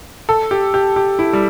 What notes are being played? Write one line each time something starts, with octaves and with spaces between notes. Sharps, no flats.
A4
G4
G4
G4
E4
G3